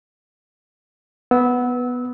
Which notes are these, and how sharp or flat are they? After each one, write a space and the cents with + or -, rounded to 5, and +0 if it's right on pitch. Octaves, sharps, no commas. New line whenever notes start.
B3 +0 E6 -25